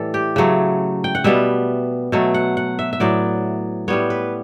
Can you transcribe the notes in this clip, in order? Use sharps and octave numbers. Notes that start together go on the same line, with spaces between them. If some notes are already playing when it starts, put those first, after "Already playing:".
Already playing: A2 E3 G3 A4
G4
C#3 F#3 A3
G5
F#5
B2 G3 B3 E5
B2 F#3 A3
F#5
F#5
E5
E5
A2 F#3 B3 D5
A2 G3 B3 C#5
B4